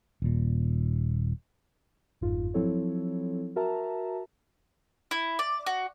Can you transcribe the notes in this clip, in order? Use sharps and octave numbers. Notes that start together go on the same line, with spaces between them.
D#1 A#2
G1 F2 G#2 F4
F3 F#3 C4 E4 A4 C#5
F#4 A#4 E5 A5 A#5
E4
D5
F#4